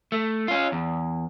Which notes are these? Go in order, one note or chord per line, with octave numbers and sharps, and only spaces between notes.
A3
C#4 F4
E2